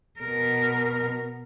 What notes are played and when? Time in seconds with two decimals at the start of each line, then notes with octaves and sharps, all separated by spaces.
0.20 B2 A#4